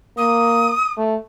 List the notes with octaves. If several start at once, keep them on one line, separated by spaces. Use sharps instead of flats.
A#3 D#6
A3